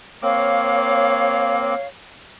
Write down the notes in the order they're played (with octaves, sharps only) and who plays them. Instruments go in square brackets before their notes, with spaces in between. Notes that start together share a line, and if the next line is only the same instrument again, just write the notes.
[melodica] A#3 C4 D6 [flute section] C#5 F5